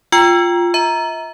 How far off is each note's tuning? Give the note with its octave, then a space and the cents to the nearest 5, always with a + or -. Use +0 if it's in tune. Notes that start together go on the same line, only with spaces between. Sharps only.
F4 +0 G5 +0 E6 +30
E5 -40 A#5 +0